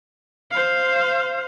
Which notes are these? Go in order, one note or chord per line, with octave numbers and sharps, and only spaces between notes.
C5 F5